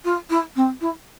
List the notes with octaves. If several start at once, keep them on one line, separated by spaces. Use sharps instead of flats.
F4
E4
C4
E4